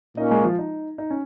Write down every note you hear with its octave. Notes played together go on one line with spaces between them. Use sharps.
A#2 A#3 C#4 D#4 D#5
G#3 G#4
F3 F4
D#4
D#4
C#4